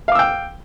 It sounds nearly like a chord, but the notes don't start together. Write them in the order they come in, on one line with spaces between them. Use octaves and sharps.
F5 D6 E6 G5